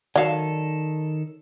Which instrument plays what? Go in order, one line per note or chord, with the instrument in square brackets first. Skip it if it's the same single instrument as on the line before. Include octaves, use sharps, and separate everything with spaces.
[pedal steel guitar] D#3 A4 [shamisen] F#3 F5 [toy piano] D5